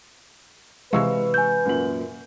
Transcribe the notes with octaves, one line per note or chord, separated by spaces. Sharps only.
C3 E3 G#3 B4 F5 C#6 E6
G#5 G6
F#2 A#2 F#7